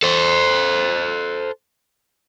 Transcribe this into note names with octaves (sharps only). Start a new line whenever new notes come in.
A4 C5